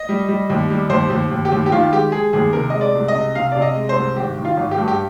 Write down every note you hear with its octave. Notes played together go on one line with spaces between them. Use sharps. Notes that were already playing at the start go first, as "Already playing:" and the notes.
Already playing: D#5
G3
G3
D#2
G3
D#2 C5
D#2
D#2
G4
D#2
G4
D#3 F4
G#3 G4
G#3 G#4
D#2 G#4
C3 A#4
G#3 D#5
D5
C2
D#5
C3
C3 F5
C3 D5
D#5
G#3
C5
C2
G#1 G4
D#3
F4
G#1
G4
G2
G4